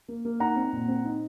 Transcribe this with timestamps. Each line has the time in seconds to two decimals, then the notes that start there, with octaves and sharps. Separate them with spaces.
0.08 A#3
0.25 A#3
0.40 D#4 F#5 A#5
0.56 C4
0.73 A#2
0.88 C4
1.05 D#4